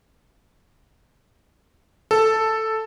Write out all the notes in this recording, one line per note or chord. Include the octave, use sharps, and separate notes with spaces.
A4